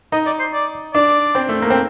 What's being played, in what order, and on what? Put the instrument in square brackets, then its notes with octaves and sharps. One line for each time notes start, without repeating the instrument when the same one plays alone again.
[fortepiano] D#4 [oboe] D#5
[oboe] D5
C5
D5
[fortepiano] D4 [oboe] D5
[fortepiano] C4
A3
A#3
C4